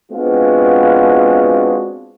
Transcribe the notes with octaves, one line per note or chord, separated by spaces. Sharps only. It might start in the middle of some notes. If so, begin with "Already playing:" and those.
G#3 B3 C4 D4 F4 F#4